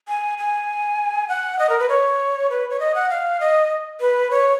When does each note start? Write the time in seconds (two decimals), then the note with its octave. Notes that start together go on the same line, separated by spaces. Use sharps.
0.08 G#5
0.38 G#5
1.29 F#5
1.59 D#5
1.70 A#4
1.79 B4
1.89 C#5
2.50 B4
2.70 C#5
2.80 D#5
2.95 F#5
3.10 F5
3.40 D#5
4.00 B4
4.31 C#5